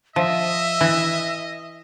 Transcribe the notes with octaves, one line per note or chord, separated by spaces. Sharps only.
F3 D#5 E5
E3